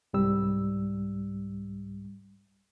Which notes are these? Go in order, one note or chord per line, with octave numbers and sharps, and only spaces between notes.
C2 G#2 G3 E6